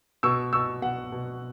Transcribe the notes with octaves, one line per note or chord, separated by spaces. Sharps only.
B2 C#6 E6
B2 C#6 E6
B2 F#5
B2